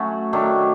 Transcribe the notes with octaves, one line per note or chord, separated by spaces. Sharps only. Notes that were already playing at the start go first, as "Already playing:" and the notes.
Already playing: F#3 A3 C#4 F#4
D#3 F#3 A3 D4